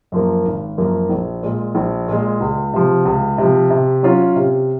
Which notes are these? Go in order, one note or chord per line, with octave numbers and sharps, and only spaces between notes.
F#2 F3 A#3
G#1
F#2 F3 A#3
A#1
A#2 G#3
A#1
A#2 G#3
C#2
C3 F3
C#2
C3 F3
C3
F#3 C#4 F4
C3